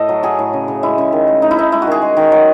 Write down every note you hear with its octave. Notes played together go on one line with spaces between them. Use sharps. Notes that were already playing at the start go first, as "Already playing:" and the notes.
Already playing: A2 A4 D#5
F#3
F#3 G#4
A2
C#3
C#3
G#3 E4
C#3
D#3
A3
A3 D#4
E4
A3 D#4
G#3 E4
F#4
D#3 G#4
G#3
D#3
F#3